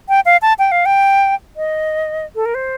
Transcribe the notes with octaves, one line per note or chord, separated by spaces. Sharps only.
G5
F5
A5
G5
F5
G5
D#5
A4
A#4
C5